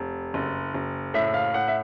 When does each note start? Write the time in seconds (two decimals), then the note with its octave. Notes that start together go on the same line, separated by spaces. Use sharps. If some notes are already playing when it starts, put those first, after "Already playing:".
Already playing: F1
0.34 F#1
0.74 F#1
1.14 A2 E5
1.34 F5
1.54 A2 F#5
1.68 E5